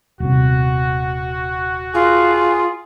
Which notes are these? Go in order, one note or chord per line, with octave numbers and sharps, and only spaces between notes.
D#1 C3 F#4
F4 G#4